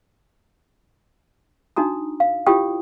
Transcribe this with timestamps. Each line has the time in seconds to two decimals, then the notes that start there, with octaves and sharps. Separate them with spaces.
1.76 D4 D#4 F#4 A#5 D#6
2.20 F5
2.46 E4 F4 G4 C#5 G5 D#6